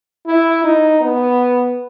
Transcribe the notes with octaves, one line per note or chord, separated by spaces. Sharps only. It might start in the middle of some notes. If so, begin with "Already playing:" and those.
E4
D#4
B3